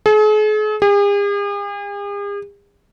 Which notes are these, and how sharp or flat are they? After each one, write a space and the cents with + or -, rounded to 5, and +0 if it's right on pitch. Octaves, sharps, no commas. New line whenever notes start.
G#4 +45
G#4 -45